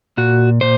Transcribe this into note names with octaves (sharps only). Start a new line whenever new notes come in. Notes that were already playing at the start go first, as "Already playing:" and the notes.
A#2 F#4
A#2 C5